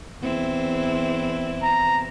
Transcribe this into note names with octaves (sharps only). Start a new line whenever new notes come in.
E2 C4 E4
A#5